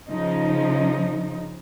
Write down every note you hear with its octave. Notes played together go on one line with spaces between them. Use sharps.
C#3 F3 D#4